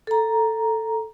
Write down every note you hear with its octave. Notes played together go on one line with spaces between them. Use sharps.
A4 A#5